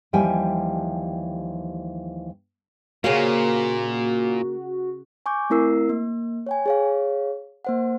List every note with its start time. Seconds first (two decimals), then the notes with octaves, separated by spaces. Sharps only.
0.13 D#2 E3 F3 G3 G5 G#5
3.04 A#2 C#3 A#3 F#4 G#4 C5 C#5 F5
5.26 G#5 C#6 D6 G6
5.50 A3 C4 E4 A#4 E6 C7
5.89 A#3
6.46 C#5 G5 G#5
6.66 G#4 C#5 F5
7.65 A#3 C5 F#5